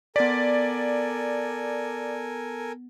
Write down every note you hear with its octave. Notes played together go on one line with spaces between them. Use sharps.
B3 A4 A#4 D5 G#5 A6 B6